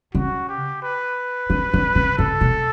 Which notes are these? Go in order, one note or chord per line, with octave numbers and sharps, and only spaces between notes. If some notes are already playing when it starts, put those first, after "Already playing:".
C#3 F#4
G4
B4
D3
D3
C#3
C#3 A4
B2